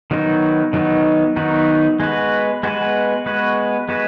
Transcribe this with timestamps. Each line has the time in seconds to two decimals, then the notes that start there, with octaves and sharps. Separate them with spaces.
0.11 D#3 F#3 B3 D#4 F#4
0.73 D#3 F#3 B3 D#4 F#4
1.36 D#3 F#3 B3 D#4 F#4
2.00 G#3 B3 F#4 B4
2.63 G#3 B3 F#4 B4
3.26 G#3 B3 F#4 B4
3.89 G#3 B3 F#4 B4